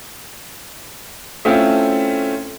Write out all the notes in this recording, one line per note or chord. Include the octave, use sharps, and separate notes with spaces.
A3 C4 C#4 E4 F4